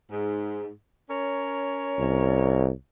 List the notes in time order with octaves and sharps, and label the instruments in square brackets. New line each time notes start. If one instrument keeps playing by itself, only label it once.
[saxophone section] G#2
C#4 A#4 C#5
[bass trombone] C2